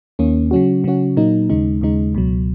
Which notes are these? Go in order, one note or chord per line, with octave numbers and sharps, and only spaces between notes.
D#2 D#3 A#3 C#4
C#3 F#3 C#4 F#4
C#3 F#3 C#4 F#4
A#2 F#3 A#3 D#4
D#2 C#3 G#3 D#4
D#2 C#3 G#3 D#4
C#2 B2 F#3